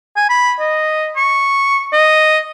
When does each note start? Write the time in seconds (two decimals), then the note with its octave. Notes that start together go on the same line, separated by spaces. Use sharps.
0.16 G#5
0.29 B5
0.59 D#5
1.16 C#6
1.92 D#5